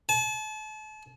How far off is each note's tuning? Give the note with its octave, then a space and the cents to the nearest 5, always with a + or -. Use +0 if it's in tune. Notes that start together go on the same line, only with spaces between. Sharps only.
A5 -40